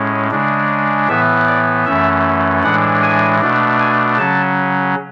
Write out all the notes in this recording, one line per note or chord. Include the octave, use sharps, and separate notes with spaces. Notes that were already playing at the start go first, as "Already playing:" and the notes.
Already playing: A2 G#3 C#4
C#3 G#3 D4
A2 E3 B3 E5
D5
F#2 E3 A3 C#4 E5
A2 E3 G#3 D4 F#5
G#5
B2 A3 D4
G#5
C#3 F#3 C#4 A5